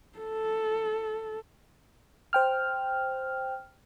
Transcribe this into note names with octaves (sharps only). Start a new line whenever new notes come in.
A4
C5 G5 F6